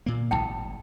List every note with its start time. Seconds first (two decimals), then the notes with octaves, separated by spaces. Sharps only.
0.06 A#2 A#3
0.31 D1 G#1 G5 A5